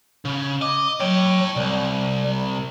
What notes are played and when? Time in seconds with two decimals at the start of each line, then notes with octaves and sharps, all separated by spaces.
0.25 C#3
0.61 D#5 D6
1.00 F#3 C#5 G5
1.56 C2 G3